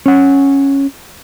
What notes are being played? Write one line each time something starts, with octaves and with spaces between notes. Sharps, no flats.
C#4 F#5